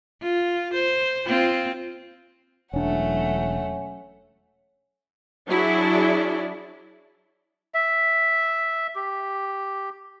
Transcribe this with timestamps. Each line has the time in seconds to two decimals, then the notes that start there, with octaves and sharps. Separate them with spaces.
0.22 F4
0.74 C5
1.26 C4 F4
2.74 E1 F#3 A3 C#4 D4 F#5
5.48 F#3 D4 E4 G#4 D5
7.74 E5
8.95 G4